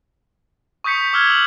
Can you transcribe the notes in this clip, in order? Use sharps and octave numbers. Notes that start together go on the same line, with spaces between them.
C#6 D#6 G6 B6 C#7
D6 E6 F6 G#6 G7
E6 F#7